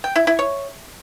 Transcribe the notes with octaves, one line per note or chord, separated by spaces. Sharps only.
G5
E4
E4
C#5